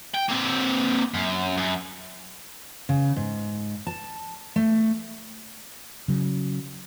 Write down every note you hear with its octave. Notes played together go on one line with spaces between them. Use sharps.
G5
A#3 C4
F#2
F#2
C#3
G#2
A5
A3
C#3 F#3